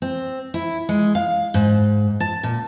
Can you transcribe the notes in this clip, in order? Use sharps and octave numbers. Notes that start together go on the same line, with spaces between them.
C4
E4
G#3
F5
G#2
A5
A#2